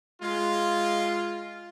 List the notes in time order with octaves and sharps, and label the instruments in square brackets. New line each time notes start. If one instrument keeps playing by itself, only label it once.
[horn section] G#3 F4